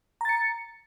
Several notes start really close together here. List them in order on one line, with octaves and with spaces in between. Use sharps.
A#5 A6 C#7